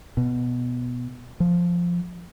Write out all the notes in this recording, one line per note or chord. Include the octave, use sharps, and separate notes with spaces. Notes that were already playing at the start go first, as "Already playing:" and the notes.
B2
F3